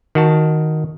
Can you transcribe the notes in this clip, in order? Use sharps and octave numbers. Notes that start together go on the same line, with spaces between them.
D#3 F#4 A5